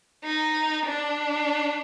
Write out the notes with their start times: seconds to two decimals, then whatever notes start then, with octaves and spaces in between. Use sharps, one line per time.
0.24 D#4
0.85 D4